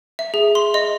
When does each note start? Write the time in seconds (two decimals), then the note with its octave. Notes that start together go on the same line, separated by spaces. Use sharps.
0.19 E5
0.34 G#4
0.55 C6
0.74 D#5